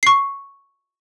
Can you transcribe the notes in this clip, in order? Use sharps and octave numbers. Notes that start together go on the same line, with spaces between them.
C#6 C7